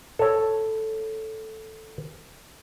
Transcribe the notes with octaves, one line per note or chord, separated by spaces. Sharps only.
A4 C#5